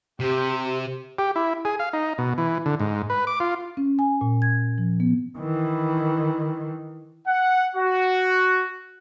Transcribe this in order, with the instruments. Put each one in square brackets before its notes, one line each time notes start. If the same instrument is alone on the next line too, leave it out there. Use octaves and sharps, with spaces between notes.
[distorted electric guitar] C3 [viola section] G4
[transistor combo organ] G4
E4
G#4
F5
D#4
B2
E3
D3
G#2
B4
D6
F4
[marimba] C#4
G#5
A#2
G#6
F3
B3
[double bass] D#3 E3
[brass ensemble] F#5
F#4